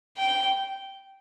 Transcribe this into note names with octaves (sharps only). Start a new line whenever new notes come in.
G5